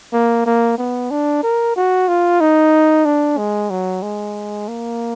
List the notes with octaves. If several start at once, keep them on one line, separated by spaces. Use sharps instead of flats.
A#3
A#3
B3
D4
A#4
F#4
F4
D#4
D4
G#3
F#3
G#3
A#3